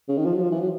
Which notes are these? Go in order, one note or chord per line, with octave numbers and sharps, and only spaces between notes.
C#3
D#3
F3
F#3
F3
E3
F#3